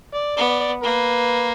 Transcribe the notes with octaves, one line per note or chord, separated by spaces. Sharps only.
D5
B3 D5
D5
D5
A#3 B4